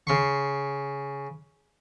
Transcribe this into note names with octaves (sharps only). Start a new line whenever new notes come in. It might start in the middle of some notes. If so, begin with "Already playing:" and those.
C#3 C6 C#6